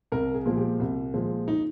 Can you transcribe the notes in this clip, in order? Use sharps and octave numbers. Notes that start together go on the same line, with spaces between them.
C2 A#4
G#4
A#2 F3 G#3
G4
C2
A#2 F3 G#3
D#4